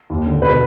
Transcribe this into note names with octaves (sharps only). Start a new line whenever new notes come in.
D#2
D3
B2 B4